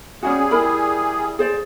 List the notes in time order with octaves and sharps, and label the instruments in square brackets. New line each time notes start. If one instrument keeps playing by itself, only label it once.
[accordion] G3 G#4 [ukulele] C#4 D#4 F#4
[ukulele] E4 A#4 B5
G#4 C5 D5